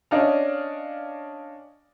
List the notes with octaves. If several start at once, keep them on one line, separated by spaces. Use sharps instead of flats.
C#4 D4 D5 D#5 F5